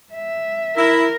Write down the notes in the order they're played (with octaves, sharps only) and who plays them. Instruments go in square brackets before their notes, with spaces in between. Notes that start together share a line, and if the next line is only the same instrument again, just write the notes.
[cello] E5
[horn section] E4 [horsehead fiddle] A#4